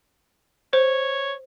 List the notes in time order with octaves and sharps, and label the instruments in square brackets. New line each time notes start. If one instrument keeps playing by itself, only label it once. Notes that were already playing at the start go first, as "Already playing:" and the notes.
[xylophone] C5 [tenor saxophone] C#5